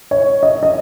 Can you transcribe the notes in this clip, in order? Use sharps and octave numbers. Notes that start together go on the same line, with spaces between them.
C#5
D#5
D#5